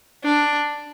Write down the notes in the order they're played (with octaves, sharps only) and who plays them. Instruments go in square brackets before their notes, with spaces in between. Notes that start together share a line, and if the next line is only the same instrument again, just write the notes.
[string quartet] D4